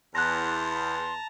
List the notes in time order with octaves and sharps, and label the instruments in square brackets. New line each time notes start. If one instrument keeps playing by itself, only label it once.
[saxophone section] E2 [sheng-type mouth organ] A5 A#5 [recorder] C6 [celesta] F#6 A#6